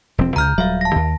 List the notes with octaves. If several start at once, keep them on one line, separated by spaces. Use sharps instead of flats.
E1 F3 C4
C#2 C#3 A#5 F6 G6
D#1 F#3 G3 E5 F5
A5 A#6
D#2